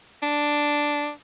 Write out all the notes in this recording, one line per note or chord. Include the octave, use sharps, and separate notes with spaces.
D4